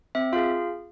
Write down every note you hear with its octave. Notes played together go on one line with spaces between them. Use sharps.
C4 E5
F4 G#4 F5